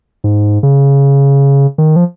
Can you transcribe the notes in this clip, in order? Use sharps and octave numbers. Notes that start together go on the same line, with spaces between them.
G#2
C#3
D#3
F3